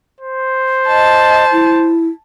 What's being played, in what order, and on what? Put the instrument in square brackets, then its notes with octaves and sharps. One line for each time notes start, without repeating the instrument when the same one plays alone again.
[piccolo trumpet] C5
[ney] D#5 [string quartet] A5
[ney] E4